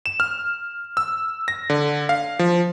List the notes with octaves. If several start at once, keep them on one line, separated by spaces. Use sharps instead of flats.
E7
F6
E6
A#6
D3
F5
F3